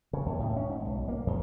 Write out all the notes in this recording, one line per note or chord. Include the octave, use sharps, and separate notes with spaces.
C#3
D#2
A2
C#4
G#2
B1
A#3
E2